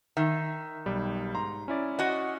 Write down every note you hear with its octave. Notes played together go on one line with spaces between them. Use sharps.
D#3 E5
B1 G3
G#2 A#5 C6
C#4 E4 D5
F#4 D#5